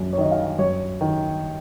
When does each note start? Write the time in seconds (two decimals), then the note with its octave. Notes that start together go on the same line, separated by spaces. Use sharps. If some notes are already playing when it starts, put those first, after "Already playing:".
Already playing: F#2 D#3
0.13 C#5
0.18 D#3 D#5
0.31 F5
0.58 F#2 C#5
1.01 D#3